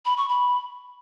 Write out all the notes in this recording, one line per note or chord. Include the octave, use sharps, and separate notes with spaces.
B5
C#6
B5